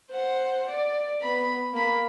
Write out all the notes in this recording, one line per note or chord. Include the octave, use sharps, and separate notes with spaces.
C5 F#5
D5
B3 B5
A#3 B5